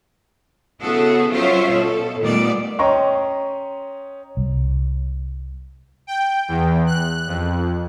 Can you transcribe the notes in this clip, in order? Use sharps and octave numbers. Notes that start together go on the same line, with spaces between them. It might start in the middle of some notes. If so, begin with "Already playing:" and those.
C#3 B3 E4 F#4 G#4 A4
F#3 C#4 F4 C5 C#5 E5
B2 A4
A#2 D#3 G3 A3 B3 D5
C#4 D#5 G5 A#5 C6 C#6
C2
G5
E2
F#6
F2